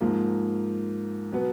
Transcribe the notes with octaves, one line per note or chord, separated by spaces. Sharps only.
G#2 F3 A#3
B2 F#3 B3